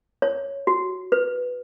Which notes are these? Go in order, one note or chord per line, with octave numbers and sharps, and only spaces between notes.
C#5
F#4
B4